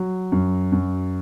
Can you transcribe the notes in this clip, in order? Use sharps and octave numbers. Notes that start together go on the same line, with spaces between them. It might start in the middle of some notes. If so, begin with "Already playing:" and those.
Already playing: F#3
F#2
F#2